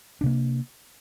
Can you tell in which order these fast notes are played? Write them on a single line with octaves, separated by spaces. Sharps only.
D4 C3 A#3